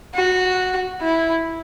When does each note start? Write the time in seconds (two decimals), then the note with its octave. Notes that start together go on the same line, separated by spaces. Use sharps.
0.15 F#4
1.02 E4